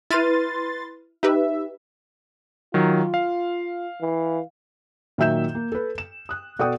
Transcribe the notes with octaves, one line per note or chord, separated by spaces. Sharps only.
E4 B4 C6 F6 A6 D#7
D#4 G4 B4 E5
D#3 F#3 F4
F5
E3
A#2 D#3 F#3 E5 G6 E7
A#3
A4 B4
E7
D#6 F#6
B2 F#4 A4 D5 G5 D#6